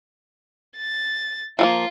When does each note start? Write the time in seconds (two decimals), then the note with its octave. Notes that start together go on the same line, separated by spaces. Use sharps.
0.76 A6
1.59 F3 A3 A#3 F4